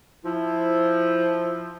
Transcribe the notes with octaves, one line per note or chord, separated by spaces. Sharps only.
F3 E4